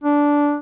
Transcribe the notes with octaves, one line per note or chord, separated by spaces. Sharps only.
D4